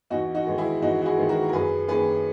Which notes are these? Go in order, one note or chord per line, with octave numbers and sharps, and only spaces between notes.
E2 D#4 F#4
D#4 F#4
D#3 G#3 B3
E4 G#4
E2 D#4 F#4
F#4
E4 G#4
D#3 G#3 B3
F#4 A#4
A#4
F#2 G#4 B4
D#3 A#3 C#4 G#4 B4